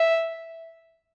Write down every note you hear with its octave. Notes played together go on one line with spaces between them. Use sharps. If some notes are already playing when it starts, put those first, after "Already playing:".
Already playing: E5